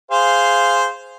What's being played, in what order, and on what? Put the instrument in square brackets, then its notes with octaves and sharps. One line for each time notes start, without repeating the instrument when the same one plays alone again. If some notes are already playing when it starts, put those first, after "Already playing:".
[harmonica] G#4 C5 F5